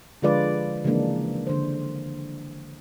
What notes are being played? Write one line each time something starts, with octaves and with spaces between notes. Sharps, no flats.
D3 F3 G#3 F4 B4 D5
C#3 E3 F3 G#3 A#3 D4
D3 C5